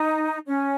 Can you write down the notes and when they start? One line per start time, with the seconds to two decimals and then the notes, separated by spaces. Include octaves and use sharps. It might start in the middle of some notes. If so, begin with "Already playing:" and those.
Already playing: D#4
0.47 C#4